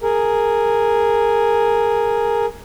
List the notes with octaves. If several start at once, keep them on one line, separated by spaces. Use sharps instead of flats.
G#4 A#4